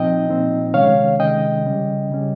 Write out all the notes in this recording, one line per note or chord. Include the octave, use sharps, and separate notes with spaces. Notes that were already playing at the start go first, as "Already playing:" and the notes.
Already playing: A#2 F3 C4 D#4 D#5 G5
A#2 F3 C4 D#4
C3 D#3 G#3 C#4 C#5 F5
C3 D#3 G#3 C#4 D#5 G5
C#3 G3 C#4
C#3 G3 C#4